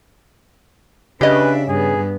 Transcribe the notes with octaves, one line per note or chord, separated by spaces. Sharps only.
C#3 D4 G4 B4 D#5 E5
G2 B3 G#4